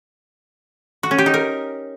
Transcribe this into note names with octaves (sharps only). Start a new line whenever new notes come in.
F#4
C#4
G4
D#4
A#4